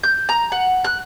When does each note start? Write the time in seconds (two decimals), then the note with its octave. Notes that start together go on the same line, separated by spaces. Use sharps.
0.03 G6
0.29 A#5
0.52 F#5
0.84 F#6